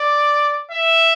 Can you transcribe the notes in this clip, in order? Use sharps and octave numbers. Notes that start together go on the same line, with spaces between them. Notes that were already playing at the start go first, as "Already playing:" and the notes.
Already playing: D5
E5